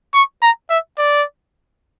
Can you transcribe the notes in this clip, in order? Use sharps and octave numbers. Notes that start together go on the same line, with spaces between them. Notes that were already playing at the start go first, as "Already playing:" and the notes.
C#6
A#5
E5
D5